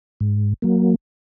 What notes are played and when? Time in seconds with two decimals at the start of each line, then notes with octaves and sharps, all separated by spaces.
0.20 G#2
0.62 F#3 A#3